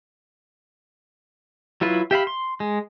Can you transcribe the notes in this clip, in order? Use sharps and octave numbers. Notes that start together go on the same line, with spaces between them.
F#3 E4 F4 B4
G4 E5 F5 B5
C6
G#3